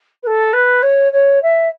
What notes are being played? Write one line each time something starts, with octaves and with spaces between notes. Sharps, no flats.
B4
A4
B4
C#5
C#5
E5